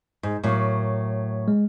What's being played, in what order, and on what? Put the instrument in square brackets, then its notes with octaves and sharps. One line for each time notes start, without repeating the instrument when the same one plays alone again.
[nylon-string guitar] G#2
A2 F#3 A#3
[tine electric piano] G#3